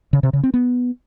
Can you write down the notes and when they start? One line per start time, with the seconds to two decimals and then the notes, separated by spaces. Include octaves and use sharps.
0.13 C#3
0.23 C3
0.33 C#3
0.43 C4
0.54 B3